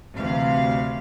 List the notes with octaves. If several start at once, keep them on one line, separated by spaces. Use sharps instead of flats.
D2 C3 E3 F5